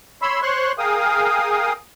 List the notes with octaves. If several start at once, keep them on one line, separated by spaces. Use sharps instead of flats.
C#5 B5 C6 E6
C5 C#5 C6 C#6 F#6
G#4 A#4 F5 G5 D#6